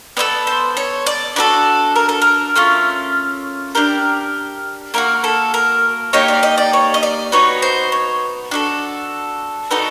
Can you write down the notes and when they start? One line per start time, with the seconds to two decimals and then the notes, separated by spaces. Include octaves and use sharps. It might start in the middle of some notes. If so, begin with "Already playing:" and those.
0.17 B3 E4 A4 D5
0.47 C5
0.77 C#5
1.06 D5
1.36 D4 F#4 A4 B4
1.96 A#4
2.09 A4
2.22 A#4
2.56 A3 C#4 F4
3.75 D4 G4 A#4
4.94 A#3 D4 F#4 A#4
5.24 A4
5.54 A#4
6.13 A#3 D#4 G4 C#5
6.28 D5
6.43 D#5
6.58 D5
6.73 C#5
6.94 D#5
7.03 D5
7.32 B3 D#4 F#4 C#5
7.62 C5
7.92 C#5
8.51 D4 F#4 A4
9.70 B3 D#4 F#4 A4 D5